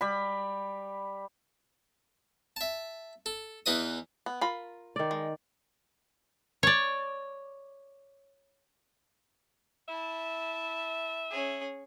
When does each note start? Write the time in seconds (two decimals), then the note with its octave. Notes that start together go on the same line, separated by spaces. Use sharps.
0.01 G3 B5
2.56 E5 A5
3.26 A4
3.66 E2 E3 B4 D#5 D#6
4.26 B3
4.41 F4 A#4 B5
4.96 D#3 D5
5.11 G#3
6.63 C#5 D5
9.88 E4 E5 A5
11.30 C#4 G#4